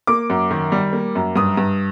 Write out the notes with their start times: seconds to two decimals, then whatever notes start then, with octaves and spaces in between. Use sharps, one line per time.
0.07 A#3 D6
0.30 F#2
0.51 D#3
0.72 G3
0.93 A#3
1.15 F#2
1.36 G2 D#6
1.57 G2